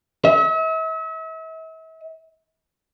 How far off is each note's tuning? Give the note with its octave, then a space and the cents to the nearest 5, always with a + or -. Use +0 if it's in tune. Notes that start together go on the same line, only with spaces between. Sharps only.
E5 -40